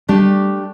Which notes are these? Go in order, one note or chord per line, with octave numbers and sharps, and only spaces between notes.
G3 A3 D4 G4